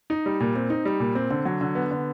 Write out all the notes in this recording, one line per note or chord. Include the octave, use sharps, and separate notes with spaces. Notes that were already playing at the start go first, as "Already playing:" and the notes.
D#4
G3
A#2
C4
D#4
G3
A#2
C4
D3
F#3
D3
B3
D3